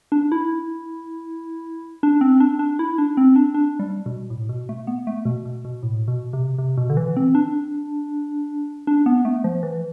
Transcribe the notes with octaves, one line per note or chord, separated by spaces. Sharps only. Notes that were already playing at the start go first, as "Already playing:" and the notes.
D4
E4
D4
C4
D4
D4
E4
D4
C4
D4
D4
G3
B2
A2
B2
A3
B3
A3
B2
B2
B2
A2
B2
C3
C3
B2
D3
E3
C4
D4
D4
B3
A3
F3
E3